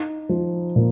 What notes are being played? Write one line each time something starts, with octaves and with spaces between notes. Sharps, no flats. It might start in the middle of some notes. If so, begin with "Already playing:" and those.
Already playing: D#4
F3
A#2